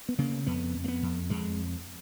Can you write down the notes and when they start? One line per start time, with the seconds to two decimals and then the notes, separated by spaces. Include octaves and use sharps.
0.09 B3
0.18 C#3 A#3
0.47 F2 B3
0.75 F2
0.84 A#3
0.88 B3
1.03 F2
1.30 F2 G#3